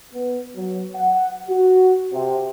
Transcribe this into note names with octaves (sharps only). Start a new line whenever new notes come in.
B3
F#3
F#5
F#4
C3